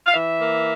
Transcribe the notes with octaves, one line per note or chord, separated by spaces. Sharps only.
F5
E3 E5
A#3